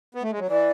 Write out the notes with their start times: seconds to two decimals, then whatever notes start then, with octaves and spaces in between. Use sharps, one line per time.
0.15 B3
0.23 A3
0.31 G#3
0.39 F#3
0.48 E3 D5